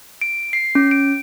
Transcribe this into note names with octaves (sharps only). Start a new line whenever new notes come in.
D7
C7
C#4
D7